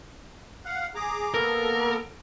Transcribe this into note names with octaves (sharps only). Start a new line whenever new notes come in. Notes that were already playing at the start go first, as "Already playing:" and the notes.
F5 F#5
G#4 A#5 D6
A#3 B3 A4 A#4